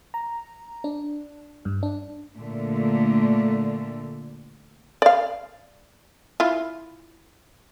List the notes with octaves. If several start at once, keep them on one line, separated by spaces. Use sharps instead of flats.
A#5
D4
G2
D4
A#2 D3 A3
D5 F5
E4 F4